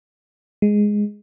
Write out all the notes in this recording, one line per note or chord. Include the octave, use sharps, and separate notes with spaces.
G#3